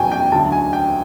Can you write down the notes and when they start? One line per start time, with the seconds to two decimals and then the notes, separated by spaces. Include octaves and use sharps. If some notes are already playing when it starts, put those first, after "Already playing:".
Already playing: E2 B2 F#3 G5 G#5
0.12 G5
0.32 D2 D3 F#3 A5
0.52 G#5
0.73 G5